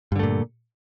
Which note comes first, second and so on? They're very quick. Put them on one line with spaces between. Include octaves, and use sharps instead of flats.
G2 D3 A3 A#2